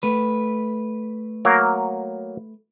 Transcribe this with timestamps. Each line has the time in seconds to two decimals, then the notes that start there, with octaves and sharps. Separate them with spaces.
0.03 A3 B4
1.45 F#3 A#3 A#4